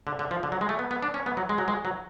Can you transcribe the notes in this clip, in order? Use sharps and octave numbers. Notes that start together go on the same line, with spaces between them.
D3
D3
F3
D3
F#3
G#3
A3
B3
B3
D4
C#4
B3
F#3
G#3
F#3
G#3
F#3